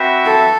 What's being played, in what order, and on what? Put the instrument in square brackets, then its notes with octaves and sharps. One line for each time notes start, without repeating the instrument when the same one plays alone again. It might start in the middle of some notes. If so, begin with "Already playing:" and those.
Already playing: [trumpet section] C4 F#4 B4 E5
[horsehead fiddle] A4